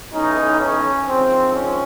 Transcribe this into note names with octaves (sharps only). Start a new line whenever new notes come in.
B1 A2 E3 C#4 D#4
C#4
A#1 G#2 F3 C4
C#4